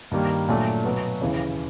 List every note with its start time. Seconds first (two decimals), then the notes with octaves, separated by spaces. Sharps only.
0.11 G2 D#3 G3 A#3
0.48 A#2 F#3 A3 D4
0.84 B2 F#3 B3
1.21 D#2 C#3 E3